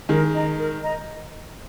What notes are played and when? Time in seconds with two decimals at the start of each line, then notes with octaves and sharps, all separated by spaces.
0.09 D#3 G#3 A#4
0.33 D#5 A#5
0.57 A#4
0.81 D#5 A#5